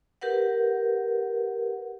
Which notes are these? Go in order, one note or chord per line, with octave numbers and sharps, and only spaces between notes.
G4 A#4 B4 F#5